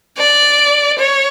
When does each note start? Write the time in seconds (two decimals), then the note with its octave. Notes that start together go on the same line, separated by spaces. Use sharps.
0.18 D5
0.99 C#5